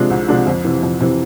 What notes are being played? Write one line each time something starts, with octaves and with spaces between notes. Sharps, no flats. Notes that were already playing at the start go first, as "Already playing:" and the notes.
Already playing: C3 F3 G#3 D4
C2
C3 F3 G#3 D4
F2
C3 E3
F2
C3 E3